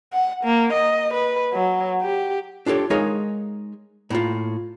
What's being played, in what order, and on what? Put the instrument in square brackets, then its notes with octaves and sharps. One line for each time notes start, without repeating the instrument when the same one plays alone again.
[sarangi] F#5
A#3
D#5
B4
F#3
G4
[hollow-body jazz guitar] D4 F4 G4 A4 C#5
G#3 D#4 G#4 A#4 C#5 F5
A2 A#3 F4